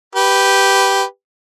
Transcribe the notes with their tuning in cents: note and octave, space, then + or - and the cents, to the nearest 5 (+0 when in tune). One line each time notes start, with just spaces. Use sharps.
G4 -5 B4 +0